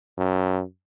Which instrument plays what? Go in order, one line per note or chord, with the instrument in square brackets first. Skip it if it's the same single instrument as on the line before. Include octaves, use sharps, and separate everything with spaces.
[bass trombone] F#2